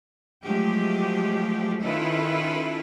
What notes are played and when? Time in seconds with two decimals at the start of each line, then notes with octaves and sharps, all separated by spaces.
0.43 F3 F#3 G#3 A3 G4
1.82 D#3 C#4 E4 F4 A4 B4